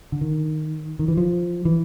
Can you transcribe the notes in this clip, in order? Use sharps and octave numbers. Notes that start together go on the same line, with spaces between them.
D3
D#3
D#3
E3
F3
E3